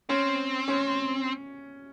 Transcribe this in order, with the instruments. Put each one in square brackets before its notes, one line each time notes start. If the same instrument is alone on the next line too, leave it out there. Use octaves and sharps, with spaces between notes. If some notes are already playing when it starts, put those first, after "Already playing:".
[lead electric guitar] C4 [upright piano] C#4
[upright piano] C#4